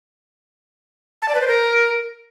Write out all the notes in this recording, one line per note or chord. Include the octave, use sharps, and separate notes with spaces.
A5
D5
B4
C5
A#4